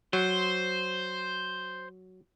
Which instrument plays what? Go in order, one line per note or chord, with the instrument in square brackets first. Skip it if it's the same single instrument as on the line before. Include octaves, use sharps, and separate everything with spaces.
[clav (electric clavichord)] F#3 [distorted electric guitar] C5